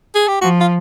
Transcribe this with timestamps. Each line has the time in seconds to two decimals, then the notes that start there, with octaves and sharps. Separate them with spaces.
0.15 G#4
0.28 G4
0.41 F3 F#4
0.60 F4